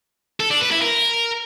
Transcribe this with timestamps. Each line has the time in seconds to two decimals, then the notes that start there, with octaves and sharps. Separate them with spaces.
0.40 A4
0.51 D4
0.61 B4
0.72 E4
0.82 A#4